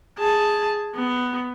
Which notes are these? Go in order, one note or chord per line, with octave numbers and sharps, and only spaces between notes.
G#4 A5
B3